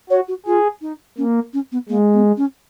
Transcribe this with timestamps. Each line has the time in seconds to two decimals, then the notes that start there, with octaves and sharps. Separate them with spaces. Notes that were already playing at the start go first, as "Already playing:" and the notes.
0.09 F#4 C#5
0.28 F#4
0.46 F4 G#4
0.81 D#4
1.17 A#3 C#4
1.53 C#4
1.72 B3
1.89 G#3 A#3
2.13 B3
2.37 C#4